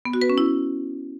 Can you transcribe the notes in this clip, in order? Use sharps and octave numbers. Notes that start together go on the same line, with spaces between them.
B3
F#4
B4
C#4
E4